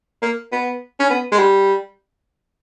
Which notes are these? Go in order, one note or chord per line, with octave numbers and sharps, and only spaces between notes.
A#3
B3
C#4
B3
G#3
G3